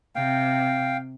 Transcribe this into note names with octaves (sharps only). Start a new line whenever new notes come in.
C3 F5 G5